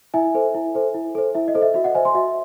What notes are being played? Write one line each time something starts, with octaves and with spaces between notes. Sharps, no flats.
E4 E5 G#5
A4 C5
E4
A4 C5
E4
A4 C5
E4 E5
D#5
A4 C5
E5
F#4 E5
D#5 F#5
C5 E5 G#5
G#5 C6
F#4 E5